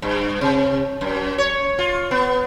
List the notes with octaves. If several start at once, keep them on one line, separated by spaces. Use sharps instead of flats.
G2
C3
F#2
C#5
F4
B3